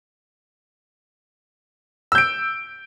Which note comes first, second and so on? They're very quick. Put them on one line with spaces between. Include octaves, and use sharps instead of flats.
E6 G6 D7